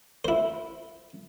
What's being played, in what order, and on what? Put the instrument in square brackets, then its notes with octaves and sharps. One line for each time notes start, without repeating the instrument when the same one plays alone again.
[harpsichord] E4 C5